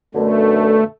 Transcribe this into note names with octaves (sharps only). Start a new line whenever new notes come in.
F#2 B2 D3 A3